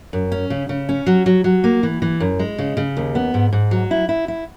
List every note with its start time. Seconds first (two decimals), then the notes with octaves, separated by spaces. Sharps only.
0.13 F#2
0.32 C#4
0.50 C#3
0.69 C#3
0.89 C#4
1.06 F#3
1.26 F#3
1.44 F#3
1.64 A#3
1.83 E3
2.02 E3
2.20 F#2
2.39 G#3
2.58 C#3
2.77 C#3
2.97 D#2
3.15 B3
3.34 G#2
3.52 G#2
3.71 F#3
3.91 E4
4.09 E4
4.28 E4